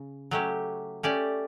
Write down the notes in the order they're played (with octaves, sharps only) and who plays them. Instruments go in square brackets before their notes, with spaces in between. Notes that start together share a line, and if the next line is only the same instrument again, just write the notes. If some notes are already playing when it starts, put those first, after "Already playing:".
Already playing: [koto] C#3
F#3 A3 C#4 G4
A3 C#4 G4 D5